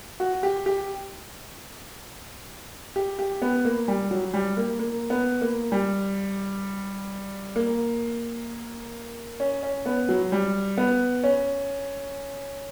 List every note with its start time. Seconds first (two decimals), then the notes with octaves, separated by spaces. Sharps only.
0.20 F#4
0.43 G4
0.66 G4
2.96 G4
3.19 G4
3.42 B3
3.65 A#3
3.88 G3
4.11 F#3
4.34 G3
4.57 A#3
4.79 A#3
5.10 B3
5.41 A#3
5.72 G3
7.56 A#3
9.40 C#4
9.63 C#4
9.86 B3
10.09 F#3
10.32 G3
10.78 B3
11.24 C#4